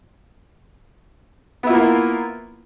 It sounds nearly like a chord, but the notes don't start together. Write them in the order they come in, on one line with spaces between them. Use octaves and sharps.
B3 E4 F4 A#3